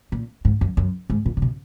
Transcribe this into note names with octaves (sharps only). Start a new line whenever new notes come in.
A#2
G#2
F#2
F#2
G#2
A#2
A#2
B2